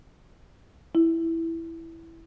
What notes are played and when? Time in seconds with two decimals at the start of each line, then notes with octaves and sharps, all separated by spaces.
0.95 E4